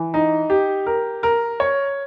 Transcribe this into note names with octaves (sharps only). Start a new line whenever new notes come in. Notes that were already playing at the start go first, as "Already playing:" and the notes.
Already playing: E3
D#4
G4
A#4
A#4
C#5